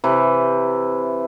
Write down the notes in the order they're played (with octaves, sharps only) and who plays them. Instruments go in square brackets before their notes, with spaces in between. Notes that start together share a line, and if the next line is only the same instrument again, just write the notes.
[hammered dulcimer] C3 E3